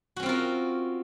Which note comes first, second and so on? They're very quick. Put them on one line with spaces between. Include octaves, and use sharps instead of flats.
F#4 C#4 C4 F4 A#4